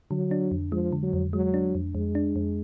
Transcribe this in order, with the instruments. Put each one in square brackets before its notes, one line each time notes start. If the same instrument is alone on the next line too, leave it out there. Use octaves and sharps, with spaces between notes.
[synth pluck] D3 [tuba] F#3
[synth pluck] D4
F2
[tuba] F3 [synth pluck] G#3
[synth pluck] D3
[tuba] F#3
[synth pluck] F2
[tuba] F#3 [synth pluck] G#3
[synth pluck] D4
F2
[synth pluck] F2 [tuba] G#3
[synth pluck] D4
F2